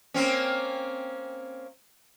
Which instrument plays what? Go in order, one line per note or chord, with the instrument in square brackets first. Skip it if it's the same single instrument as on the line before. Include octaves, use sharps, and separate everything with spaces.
[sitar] A#3 C4 C#4